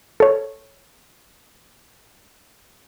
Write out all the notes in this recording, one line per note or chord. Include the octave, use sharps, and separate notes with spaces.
A4 C#5